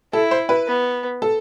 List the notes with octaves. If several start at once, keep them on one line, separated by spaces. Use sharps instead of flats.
E4 A4
C5
B4
B3
A4